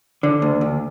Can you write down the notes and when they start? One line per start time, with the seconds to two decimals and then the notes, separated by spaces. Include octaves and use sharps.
0.23 D3
0.42 D2
0.61 D2